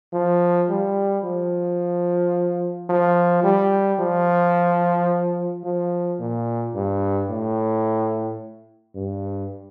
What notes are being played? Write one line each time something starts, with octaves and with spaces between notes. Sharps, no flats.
F3
G3
F3
F3
G3
F3
F3
A#2
G2
A2
G2